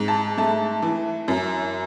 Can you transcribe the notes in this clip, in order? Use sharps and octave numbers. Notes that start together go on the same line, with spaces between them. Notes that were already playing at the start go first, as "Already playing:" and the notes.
Already playing: G#2
A5
A3 A5
E3
F#2